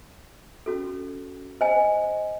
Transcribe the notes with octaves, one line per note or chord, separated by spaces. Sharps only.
C#4 F#4 A4
C5 D#5 G#5